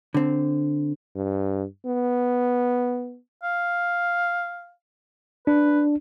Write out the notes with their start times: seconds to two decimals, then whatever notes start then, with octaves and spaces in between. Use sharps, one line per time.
0.14 D3 C4
1.16 G2
1.86 B3
3.43 F5
5.47 D4 B4